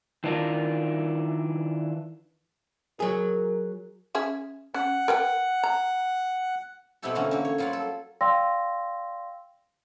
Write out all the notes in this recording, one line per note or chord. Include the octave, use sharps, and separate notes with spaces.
D#3 E3 D4 F4 A#4
F#3 G#4 A#4
C#4 G#4 E5
C#4 F#5
A#4 B4 G5
A#5
B2 B3 C4 E4 G4 A4
D3 E3 A#3 B3 C#4 F#4
D3 A#3
C#5
F#3 G3 F4 C#5 F#5
A4
D5 F5 G5 C6 E6 A#6